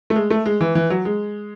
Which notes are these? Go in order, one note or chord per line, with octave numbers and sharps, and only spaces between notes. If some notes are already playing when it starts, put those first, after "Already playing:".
A3
G#3
A3
G#3
E3
E3
F#3
G#3